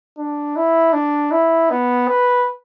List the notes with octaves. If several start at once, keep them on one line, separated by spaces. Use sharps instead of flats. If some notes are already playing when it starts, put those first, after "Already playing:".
D4
E4
D4
E4
B3
B4